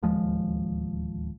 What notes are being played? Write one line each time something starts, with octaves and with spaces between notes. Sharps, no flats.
D1 D#2 F3 G#3